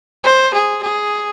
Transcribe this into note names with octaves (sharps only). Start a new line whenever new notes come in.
C5
G#4
G#4